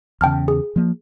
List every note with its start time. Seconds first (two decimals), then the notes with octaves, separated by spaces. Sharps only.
0.21 E2 C#3 G5 A5 F6
0.48 G#4
0.76 F3 A#3